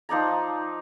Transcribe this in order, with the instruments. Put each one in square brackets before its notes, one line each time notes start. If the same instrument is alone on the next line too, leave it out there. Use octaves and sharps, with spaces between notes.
[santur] F3 D#4 D5 A#5